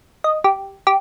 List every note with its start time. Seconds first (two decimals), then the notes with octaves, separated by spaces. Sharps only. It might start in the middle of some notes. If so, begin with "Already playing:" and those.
0.24 D#5
0.44 G4
0.87 G4